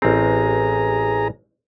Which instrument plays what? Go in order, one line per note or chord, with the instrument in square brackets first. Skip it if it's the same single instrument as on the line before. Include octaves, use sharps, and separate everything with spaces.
[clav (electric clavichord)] A1 C4 [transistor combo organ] G#4 A#5